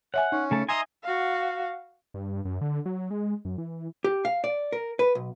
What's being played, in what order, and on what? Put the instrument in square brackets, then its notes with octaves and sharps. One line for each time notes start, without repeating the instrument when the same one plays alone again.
[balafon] C#5 E5 G#5 [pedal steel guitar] F#5
[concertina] C#4 [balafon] D#4
[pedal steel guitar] C#3 A3 A5
[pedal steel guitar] D#5 E5 G#5 [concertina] A#5 C6 D#6
[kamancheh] F#4 F5
[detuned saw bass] G2
F#2
D3
F#3
G#3
F#2
E3
[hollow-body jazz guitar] G4
F5
D5
A#4
B4
B1